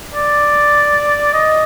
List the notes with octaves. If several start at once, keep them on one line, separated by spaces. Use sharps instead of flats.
D5
D#5